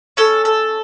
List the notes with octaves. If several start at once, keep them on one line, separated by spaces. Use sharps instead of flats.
C#4 A4
A4